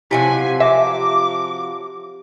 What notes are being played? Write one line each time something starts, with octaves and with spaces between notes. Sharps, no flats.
C3 F3 F#3 E4 G4 G#5 B6
G4 E5 D6 A#6